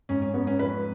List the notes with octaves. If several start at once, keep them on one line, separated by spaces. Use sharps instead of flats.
G#2 C#4
C#4
G#2 B3
C#4
F2 B4